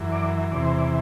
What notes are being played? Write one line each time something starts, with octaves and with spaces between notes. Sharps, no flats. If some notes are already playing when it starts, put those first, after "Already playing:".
Already playing: F#2 E3
D5
E2 C3 E3 D5
C5
D5